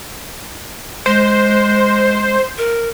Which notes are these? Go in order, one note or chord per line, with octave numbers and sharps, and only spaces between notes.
G#3 C5
A#4